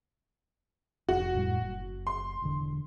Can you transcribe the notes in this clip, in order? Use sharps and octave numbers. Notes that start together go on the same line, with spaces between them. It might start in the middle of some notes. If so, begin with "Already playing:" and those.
F1 F#4
F2 A2 G3
F#1
C6
E1 D3